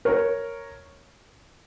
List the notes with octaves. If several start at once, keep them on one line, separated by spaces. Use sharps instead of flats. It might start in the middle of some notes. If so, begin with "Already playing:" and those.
A#4 C#5